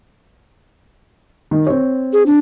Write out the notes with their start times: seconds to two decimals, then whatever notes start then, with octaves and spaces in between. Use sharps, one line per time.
1.51 D#3
1.67 C4 C#5
2.13 G#4
2.26 D4